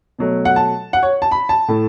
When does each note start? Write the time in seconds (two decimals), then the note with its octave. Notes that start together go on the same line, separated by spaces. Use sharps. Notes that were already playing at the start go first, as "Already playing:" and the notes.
0.19 B2 F#3 A3
0.45 F#5
0.56 A5
0.93 F#5
1.03 C#5
1.22 A5
1.31 B5
1.49 A5
1.68 A2 A3